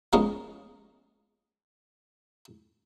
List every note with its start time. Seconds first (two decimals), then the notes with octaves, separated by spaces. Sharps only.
0.13 F3 G#3 B3 C#4 A#4 D#5